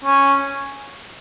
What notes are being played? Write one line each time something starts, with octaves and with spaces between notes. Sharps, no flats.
C#4